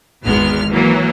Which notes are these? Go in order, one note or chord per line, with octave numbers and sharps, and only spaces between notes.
G#1 E2 G#3 B3 F6
E3 F#3 A#3